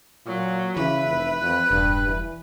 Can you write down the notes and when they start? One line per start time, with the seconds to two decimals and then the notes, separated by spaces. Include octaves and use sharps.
0.27 A#2 F#3
0.77 C#3 E3 B4 E5
1.05 F1
1.40 F2 F#6
1.71 E1 G2
2.08 E3